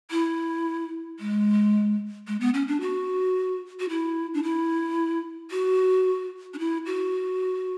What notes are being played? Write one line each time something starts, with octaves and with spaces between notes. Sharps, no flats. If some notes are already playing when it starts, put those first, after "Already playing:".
E4
G#3
G#3
B3
C#4
D4
F#4
F#4
E4
D4
E4
F#4
D4
E4
F#4